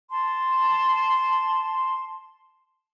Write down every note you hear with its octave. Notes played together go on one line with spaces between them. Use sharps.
A5 C6